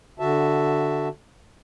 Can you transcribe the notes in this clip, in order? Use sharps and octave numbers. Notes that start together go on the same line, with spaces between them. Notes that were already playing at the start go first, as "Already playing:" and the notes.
D3 F#4 E5 A5